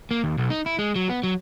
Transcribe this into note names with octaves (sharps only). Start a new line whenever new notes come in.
A#3
D#2
B1
D#4
E4
G#3
F#3
B3
F#3